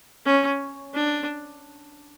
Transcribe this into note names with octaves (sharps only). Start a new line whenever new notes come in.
C#4
D4